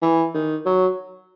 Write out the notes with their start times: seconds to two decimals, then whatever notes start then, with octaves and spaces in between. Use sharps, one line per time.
0.02 E3
0.34 D#3
0.66 F#3